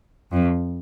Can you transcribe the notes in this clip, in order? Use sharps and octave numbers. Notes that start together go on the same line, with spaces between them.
F2